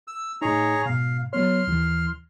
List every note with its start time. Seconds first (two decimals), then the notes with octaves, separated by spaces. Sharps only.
0.08 E6
0.42 A2 D#4 G#4 C#5 A#5
0.86 G#2 B2 F5
1.33 F#3 B3 C#5 C6 F6
1.67 D#2 E3